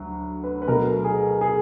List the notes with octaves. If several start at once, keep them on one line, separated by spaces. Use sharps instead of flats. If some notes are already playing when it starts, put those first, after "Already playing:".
Already playing: D2 D3 F#3
B4
B4
B2 F#3 A3 A#4
G#4
G#4